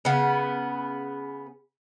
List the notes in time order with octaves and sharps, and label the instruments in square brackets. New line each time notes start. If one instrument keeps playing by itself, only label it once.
[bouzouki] C#3 B3